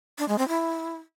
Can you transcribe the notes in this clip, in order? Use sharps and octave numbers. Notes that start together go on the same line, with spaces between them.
D4
G#3
C4
E4